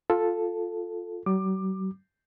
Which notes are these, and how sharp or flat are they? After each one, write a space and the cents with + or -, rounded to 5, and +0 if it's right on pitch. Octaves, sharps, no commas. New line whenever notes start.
F4 +10 A4 +0
F#3 +45 D6 +20